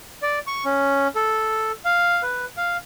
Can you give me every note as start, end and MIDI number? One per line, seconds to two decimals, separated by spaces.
0.22 0.39 74
0.47 0.64 85
0.65 1.08 61
1.16 1.72 69
1.85 2.22 77
2.22 2.45 71
2.57 2.77 77